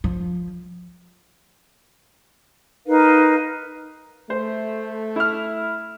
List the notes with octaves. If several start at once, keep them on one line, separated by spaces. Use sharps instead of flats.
F3
D#4 A#4 B4 F5
A3 C5
E4 F6